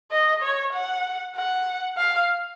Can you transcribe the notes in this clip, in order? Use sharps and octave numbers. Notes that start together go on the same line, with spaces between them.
D#5
C#5
F#5
F#5
F5